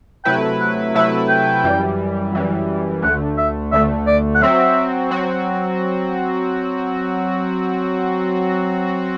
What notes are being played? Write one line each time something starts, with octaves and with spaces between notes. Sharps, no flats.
C3 F#3 A3 E4 B4 G5
F#5
C3 F#3 A3 E4 B4 E5
G5
F#2 E3 G3
F#2 E3 G3
D2 D3 A3 F#5
E5
D2 D3 A3 E5
D5
F#5
F#3 C4 F#4 E5
F#3 C4 F#4